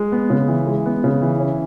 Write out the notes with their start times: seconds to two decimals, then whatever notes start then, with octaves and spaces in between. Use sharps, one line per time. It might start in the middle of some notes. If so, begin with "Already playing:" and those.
Already playing: G#3
0.12 B3
0.30 C#3
0.48 E3
0.67 G#3
0.86 B3
1.04 C#3
1.22 E3
1.40 C#4